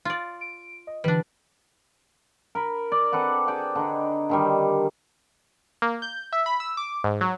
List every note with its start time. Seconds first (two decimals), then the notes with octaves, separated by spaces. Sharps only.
0.05 F4 D5
0.41 D7
0.87 D#5
1.04 D3 E3 G3 D4 B4
2.55 A#4 B5
2.92 D5
3.12 C4 A4 B4 F#5
3.48 G#4 D5 G5 A5
3.75 D3 D#4
4.29 D3 D#3 G3
5.82 A#3
6.02 G6
6.33 E5
6.46 B5
6.60 E6
6.77 D6
7.04 G#2
7.21 F#3